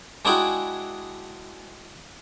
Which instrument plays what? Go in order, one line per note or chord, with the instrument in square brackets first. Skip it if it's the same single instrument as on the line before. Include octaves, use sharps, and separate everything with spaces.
[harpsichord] G#3 D4 E4 F#4 G#4 G5